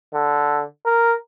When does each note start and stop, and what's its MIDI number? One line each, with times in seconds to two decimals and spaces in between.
0.14 0.64 50
0.86 1.14 70